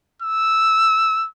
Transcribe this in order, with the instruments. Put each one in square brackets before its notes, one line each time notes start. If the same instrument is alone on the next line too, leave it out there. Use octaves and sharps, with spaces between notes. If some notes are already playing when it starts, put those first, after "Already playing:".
[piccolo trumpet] E6